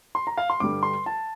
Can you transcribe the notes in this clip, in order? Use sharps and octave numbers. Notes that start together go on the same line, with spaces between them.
C6
A#5
F5
C6
G2 D3 G3 D6
C6
A5